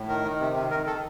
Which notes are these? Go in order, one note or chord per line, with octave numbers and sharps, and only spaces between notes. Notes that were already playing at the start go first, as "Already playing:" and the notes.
Already playing: A2
D#3 A#4
D#3
C3
D#3
D#3 A#4
D#3 A4